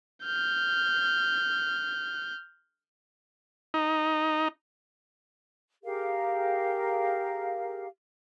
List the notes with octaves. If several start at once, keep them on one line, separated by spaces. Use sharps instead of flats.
F6 G6
D#4
G4 G#4 A#4 F5